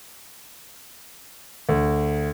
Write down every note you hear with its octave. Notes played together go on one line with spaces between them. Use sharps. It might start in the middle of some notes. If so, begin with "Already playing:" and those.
D2